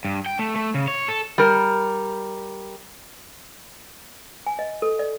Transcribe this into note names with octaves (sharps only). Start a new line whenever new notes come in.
G2
G5
A3
A3
C#3
C#5
A4
G3 A#4
G#5
D#5
A4
D5